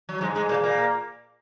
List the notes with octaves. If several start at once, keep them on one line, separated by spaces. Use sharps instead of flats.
F#3
G#2 G#3
G#2 G#3
A#2 A#3
A#2 A#3